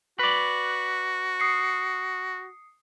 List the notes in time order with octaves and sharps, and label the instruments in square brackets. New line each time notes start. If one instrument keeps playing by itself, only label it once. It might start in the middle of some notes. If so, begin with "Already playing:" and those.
[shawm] F#4 [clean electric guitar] B4 D5
[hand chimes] D#6 C7 C#7